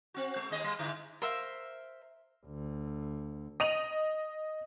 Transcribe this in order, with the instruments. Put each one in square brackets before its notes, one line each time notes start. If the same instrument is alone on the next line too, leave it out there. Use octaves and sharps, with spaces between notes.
[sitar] C4 F#4
G#3
D#2 G#3 D#5
G3
G#2 D3 E4
[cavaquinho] A#4 C5 E5 F5
[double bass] D2
[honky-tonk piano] D#5 D#7 F7 F#7